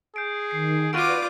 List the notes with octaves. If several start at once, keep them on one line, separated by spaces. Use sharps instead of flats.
G#4 G6 C7 D7
D#3 C7
F4 F#4 B4 D5 D6 D7 D#7